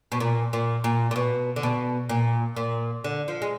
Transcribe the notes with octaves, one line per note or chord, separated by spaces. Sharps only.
B2
A#2
A#2
A#2
A#2
B2
D3
B2
A#2
A#2
D3
F3
G#3